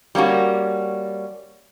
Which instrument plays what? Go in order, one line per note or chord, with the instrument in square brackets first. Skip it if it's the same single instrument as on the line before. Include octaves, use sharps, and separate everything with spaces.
[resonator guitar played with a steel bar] G3 A#3 C#4 F#4